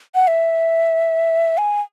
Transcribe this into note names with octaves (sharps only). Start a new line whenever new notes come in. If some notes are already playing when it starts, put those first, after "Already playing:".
F#5
E5
G#5